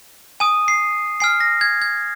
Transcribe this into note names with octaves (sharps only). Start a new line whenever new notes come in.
G#5 D#6 D#7
C7
G#5 F6 C7
A#6
G#6
G#6